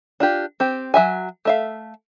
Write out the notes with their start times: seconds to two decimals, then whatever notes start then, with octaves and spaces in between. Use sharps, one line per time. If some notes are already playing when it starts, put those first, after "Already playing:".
0.20 D4 F4 G4
0.60 C4 G4
0.94 F#3 E5 G#5
1.45 A3 E5 F5